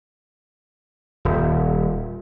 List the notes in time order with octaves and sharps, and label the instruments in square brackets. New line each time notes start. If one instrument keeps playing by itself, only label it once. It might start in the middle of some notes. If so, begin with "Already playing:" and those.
[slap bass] D#1